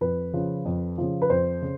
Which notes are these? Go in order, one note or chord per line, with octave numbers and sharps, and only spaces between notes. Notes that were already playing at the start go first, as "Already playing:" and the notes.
F2 B4
C#3 F3
F2
C#3 F3
B4
F2 C5
C#3